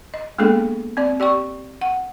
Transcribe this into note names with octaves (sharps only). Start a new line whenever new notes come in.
D#5
G#3 A#3 B3 D4 G#4 A4
C4 D5
G4 D5 G5 C#6
F#5